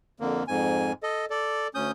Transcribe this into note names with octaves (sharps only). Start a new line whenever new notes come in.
F2 D3 A#3
F2 G#2 G#5
A4 D#5
A4 D5
D2 C#4 D#6 G6